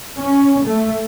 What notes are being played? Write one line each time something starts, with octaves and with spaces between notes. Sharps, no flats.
C#4
A3